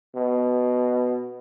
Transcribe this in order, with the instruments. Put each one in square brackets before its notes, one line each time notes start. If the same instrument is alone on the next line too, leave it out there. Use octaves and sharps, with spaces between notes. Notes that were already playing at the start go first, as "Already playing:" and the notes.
[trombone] B2